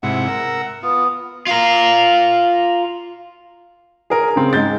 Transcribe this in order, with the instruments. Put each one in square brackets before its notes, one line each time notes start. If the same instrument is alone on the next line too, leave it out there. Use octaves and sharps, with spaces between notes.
[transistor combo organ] G#2 C3 E4 [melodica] F#5
[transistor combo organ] A#4 E6
[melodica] B3 [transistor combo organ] F4
[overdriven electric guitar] F4 A#4
[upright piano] G#4 A#4
C#3 C4
G#2 G#3 G6 A6